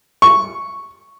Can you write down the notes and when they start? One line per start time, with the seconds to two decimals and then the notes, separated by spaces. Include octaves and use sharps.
0.22 C#6